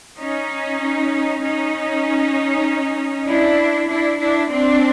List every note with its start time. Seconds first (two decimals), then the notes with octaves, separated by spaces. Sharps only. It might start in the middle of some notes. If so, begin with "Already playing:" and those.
0.19 C#4 D#4
1.43 C#4 D#4
3.28 D4 E4
3.89 D4 E4
4.20 D4 E4
4.51 C4 D4